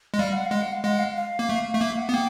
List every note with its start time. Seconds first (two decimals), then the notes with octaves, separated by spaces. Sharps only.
0.14 G#3
0.19 G3 F5
0.32 F#5
0.45 F5
0.51 G#3
0.58 F#5
0.72 F5
0.84 G#3 F#5
0.99 F5
1.16 F5
1.39 A#3
1.49 A3
1.74 A3
1.81 A#3 E5
1.98 F#5
2.09 B3
2.13 A#3 G5